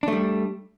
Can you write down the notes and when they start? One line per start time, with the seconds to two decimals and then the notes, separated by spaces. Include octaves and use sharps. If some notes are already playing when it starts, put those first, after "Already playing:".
0.03 D4
0.08 A3
0.12 G3